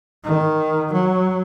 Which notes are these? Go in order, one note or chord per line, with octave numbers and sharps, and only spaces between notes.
D#3
F#3